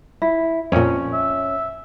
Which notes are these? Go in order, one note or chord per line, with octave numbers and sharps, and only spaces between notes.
E4
F2 A#2 C#4
E5